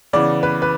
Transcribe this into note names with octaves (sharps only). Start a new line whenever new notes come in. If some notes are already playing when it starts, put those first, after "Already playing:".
C#3 E3 B3 D5
B4
B4